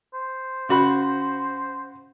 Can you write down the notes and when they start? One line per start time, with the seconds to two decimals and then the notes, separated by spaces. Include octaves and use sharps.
0.14 C5
0.69 C#3 F#4 B5